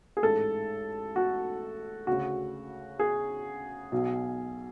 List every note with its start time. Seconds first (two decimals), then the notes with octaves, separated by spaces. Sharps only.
0.17 G#4
0.23 A1 G#2 A4
1.16 F#4
2.07 D2 C#3 F#4
2.99 G#4
3.92 B1 B2